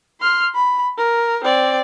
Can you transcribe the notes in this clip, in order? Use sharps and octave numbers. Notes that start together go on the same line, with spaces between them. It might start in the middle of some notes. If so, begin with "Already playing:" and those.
C6 F6
B5
A#4
C4 D5